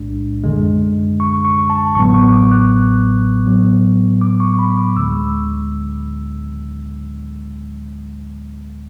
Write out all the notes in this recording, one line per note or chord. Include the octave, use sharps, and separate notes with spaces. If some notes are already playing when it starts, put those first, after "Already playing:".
Already playing: B1 A2 G#3 D4
F#2 D3 G#3
C#6
C#6
A5
A1 A2 F#3 B3 C#6
C#6
D6
F#6
A2 F#3 B3
D6
C#6
B5
D6
D2 D3 G#3 E6